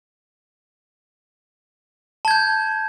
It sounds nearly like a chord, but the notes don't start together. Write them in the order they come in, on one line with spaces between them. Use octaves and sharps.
A5 G#6 G6